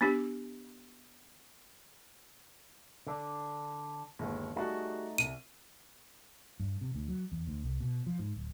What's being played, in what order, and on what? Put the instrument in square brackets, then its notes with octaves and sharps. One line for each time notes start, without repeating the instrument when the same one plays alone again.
[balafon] B3 D4 G4
[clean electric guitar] D3 D4
[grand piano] G1 D#2 G#3
[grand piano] G3 F#4 G#4 [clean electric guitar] A3 D#4
[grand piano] C2 [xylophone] D#7
[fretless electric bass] G2
C3
D2
F#3
E2
D2
C2
B2
F3
G#2
D1